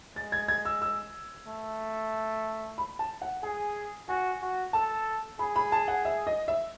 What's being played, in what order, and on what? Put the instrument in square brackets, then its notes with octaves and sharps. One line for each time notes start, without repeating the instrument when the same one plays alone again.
[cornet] G#3 [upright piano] A6
[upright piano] G#6
G#6
E6
E6
[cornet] A3
[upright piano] B5
A5
F#5
[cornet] G#4 [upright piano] G#5
[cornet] F#4 [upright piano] G#5
[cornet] F#4
[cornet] A4 [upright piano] A5
[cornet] G#4 [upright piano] B5
[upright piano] B5
A5
F#5
E5
D#5
E5